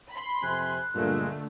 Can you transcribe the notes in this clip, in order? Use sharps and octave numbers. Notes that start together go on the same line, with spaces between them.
B5 C6
F2 C3 G#5 F#6
G2 A#2 D3 G#3 A3